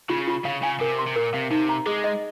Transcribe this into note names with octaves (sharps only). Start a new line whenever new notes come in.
C#3 F4
F4
C#3 F5
C#3 G#5
C3 A#4
C6
C3
A#2 A#4
C3 F5
C3 D#4
A#5
G#3 G#4
D#5